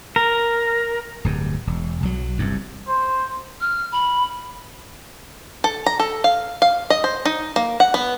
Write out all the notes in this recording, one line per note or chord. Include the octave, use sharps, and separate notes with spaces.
A#4
D1 G2
E1
B1 F#3
F#1 C2 G2
C5
F6
B5
A4
A#5
A4
F5
F5
D#5
C5
D#4
A#3
F#5
B3